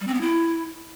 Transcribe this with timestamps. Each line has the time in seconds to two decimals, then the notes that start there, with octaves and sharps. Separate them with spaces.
0.01 G3
0.07 C4
0.14 B3
0.21 E4